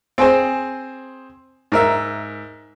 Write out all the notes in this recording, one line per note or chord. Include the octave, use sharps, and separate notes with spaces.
C4 G#4 C5
G#2 A#4 E5